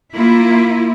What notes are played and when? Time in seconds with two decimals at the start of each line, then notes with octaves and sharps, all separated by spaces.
0.13 A#3 E4 F4